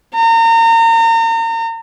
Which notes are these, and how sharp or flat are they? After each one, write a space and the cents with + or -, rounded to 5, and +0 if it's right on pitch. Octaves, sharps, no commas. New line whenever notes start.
A#5 -35